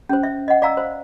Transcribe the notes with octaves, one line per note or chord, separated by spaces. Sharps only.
C#4 C5
E5
D#5 F#5
D5 F5 A#5 E6
C5